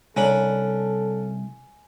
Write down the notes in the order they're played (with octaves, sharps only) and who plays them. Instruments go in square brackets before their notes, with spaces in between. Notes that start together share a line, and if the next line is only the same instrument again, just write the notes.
[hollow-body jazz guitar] C2 [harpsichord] C#4 D4 B5 [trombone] A4 [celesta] G#5